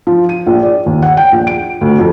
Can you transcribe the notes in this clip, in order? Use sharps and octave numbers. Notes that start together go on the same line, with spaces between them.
F3
D#7
A#1
D5
D#2
F#5
G5
A#1
D7
D2
F2